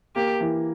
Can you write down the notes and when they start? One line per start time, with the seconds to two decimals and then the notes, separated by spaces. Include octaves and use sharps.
0.16 A#3 G4
0.41 E3